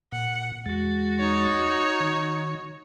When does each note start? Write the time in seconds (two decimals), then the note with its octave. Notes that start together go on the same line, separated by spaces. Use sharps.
0.12 A#2 F#5
0.66 E2 G#3 F#4 A6
1.19 D#4 C#5
2.00 D#3